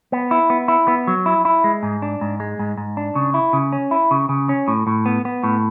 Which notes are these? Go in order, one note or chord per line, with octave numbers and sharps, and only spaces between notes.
B3
E4
B3
E4
B3
F#3
E4
E4
G#3
G#2
D4
G#2
G#3
G#2
G#2
D4
C#3
E4
C#3
C#4
E4
C#3
C#3
C#4
A2
A2
B3
B3
A2